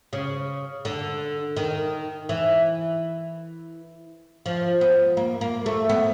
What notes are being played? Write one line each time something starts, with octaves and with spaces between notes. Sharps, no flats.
C#3
D3
D#3
E3
F3
B3
A#3
A#3
A3
B3